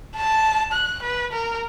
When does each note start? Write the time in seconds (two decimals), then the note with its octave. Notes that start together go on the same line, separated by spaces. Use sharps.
0.15 A5
0.72 F#6
1.02 B4
1.32 A#4